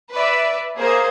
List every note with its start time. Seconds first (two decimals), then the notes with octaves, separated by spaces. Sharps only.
0.12 B4 D5 E5
0.77 A#3 G#4 C5